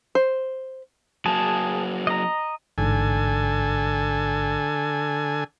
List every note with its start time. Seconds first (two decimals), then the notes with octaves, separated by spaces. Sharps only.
0.15 C5
1.26 F#3 A#3 G#4 A5
2.07 D#5 A#5
2.78 A1 G#2 D3 A4 G#5